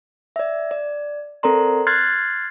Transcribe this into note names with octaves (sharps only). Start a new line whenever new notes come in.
D5 E5
D5
C4 A4 A#4 D5 A#5 C6
C6 F6 F#6 G#6 A6 C7